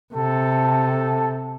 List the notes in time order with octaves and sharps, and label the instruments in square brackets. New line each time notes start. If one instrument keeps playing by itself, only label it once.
[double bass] C3 [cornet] A4